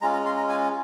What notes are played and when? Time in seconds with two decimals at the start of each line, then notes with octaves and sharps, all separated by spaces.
0.02 G#3 C#4 F4 A#5
0.13 A#5
0.26 C6
0.37 A#5
0.49 G#5